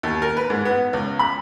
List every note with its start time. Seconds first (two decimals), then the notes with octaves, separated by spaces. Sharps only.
0.03 D#2
0.22 A#4
0.37 B4
0.50 G#2
0.65 B3
0.93 C#2
1.19 B5